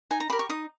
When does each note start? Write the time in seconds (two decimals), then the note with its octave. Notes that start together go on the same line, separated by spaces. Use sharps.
0.11 D#4 G#5
0.20 A#5
0.30 G4 A#4 B5
0.39 C#6
0.49 D#4 D#6